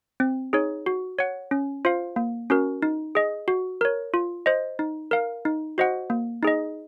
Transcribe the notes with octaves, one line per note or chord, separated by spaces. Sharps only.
C4
D#4 G#4 C#5
F#4
C#5 F#5
C#4
F4 C5 F5
A#3
C#4 F#4 A#4
D#4
G#4 D#5
F#4
A#4 C#5
F4
C5 D#5
D#4
A#4 F5
D#4
F#4 C5 D#5 F#5
A#3
D#4 G#4 D#5